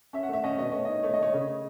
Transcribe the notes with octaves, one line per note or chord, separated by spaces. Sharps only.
C#4 E5
F#5
A3 E5
C#4 D#5
B2 D#5
A3 C#5
D#4 D#5
A3 C#5
D#5
A3 C#5
C#3 D#5